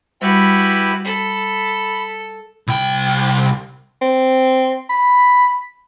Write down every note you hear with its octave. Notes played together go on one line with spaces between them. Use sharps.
G3 E4 F#4 G4 B4
A4 B5
C2 G5
C4
B5